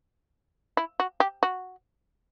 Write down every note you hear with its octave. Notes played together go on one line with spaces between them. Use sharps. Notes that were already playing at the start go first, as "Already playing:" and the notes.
E4
F#4
G4
F#4